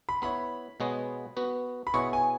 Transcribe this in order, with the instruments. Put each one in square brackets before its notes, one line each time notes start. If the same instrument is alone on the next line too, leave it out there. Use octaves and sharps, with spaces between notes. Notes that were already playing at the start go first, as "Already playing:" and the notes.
[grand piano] B5
[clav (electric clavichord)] B3 E4 C#5 [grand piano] B5
[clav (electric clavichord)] B2 G#3 B3 G#4 C#5
B3 F#4 B4
[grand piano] B5
[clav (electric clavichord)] B2 B3 E4 G#4 C#5 [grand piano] C#6
[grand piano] G#5